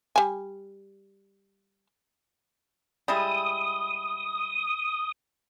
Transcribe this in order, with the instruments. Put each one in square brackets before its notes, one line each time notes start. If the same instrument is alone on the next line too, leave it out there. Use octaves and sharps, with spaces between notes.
[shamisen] G3 G#5
[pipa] G3 G#3 E4 [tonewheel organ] D#6